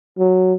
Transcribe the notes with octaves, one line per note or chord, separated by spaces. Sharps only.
F#3